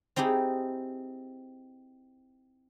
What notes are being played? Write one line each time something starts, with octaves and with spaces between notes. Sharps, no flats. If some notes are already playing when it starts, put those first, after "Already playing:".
C4 D#4 E4 G4 G#4